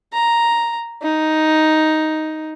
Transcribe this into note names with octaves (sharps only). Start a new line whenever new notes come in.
A#5
D#4